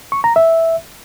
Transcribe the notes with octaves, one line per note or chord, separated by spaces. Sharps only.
C#6
A#5
E5